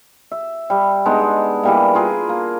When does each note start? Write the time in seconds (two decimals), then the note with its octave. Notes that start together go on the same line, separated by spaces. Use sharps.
0.31 E5
0.70 G3
1.06 G#3 B3 D4 D#4
1.63 E3 G3 A#3
1.95 F4 G#4 A#4 B4
2.29 A#3